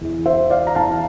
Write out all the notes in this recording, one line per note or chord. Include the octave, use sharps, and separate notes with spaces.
E2 E3
C5 E5
D5 F5
A#5
E2 E3 F5 A5